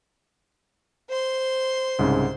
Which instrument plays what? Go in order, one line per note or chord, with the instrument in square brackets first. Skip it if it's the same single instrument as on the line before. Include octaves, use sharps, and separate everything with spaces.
[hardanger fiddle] C5 C6
[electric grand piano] C2 G#2 C#3